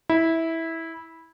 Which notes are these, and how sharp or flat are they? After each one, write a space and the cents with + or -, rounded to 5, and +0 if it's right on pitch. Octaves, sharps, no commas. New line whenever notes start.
E4 -15